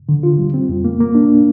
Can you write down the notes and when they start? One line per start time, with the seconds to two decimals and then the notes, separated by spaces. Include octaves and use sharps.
0.09 D3
0.23 F4
0.38 G3
0.54 C4
0.69 F2
0.85 A#3
1.00 A#3
1.15 D4